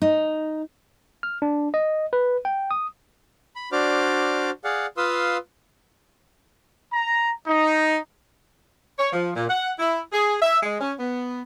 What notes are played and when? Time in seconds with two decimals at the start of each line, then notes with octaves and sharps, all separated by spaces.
0.02 D#4
1.23 F6
1.42 D4
1.74 D#5
2.13 B4
2.45 G5
2.71 D#6
3.56 B5
3.72 D4 F#4 C5 D5 D6 F6
4.64 G#4 D5 F5 F#5
4.97 F4 B4 F5 C6 D#6 E6
6.93 A#5
7.47 D#4
8.98 C#5
9.13 F3
9.35 A#2
9.48 F#5
9.79 E4
10.13 G#4
10.42 E5
10.63 G#3
10.81 C#4
10.99 B3